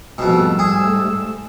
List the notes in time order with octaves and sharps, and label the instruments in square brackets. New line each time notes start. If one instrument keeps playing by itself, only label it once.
[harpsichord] F2 B2 [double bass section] G#2 G3 A3 [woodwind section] E6
[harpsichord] G#4